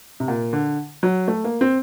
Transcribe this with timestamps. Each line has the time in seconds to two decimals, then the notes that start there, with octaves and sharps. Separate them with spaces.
0.20 C3
0.28 A#2
0.53 D3
1.03 F#3
1.28 A3
1.44 A#3
1.61 C4